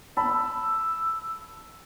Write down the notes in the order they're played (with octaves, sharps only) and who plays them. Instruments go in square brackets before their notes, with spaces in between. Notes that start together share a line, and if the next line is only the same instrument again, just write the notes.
[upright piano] A5 B5 [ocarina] E6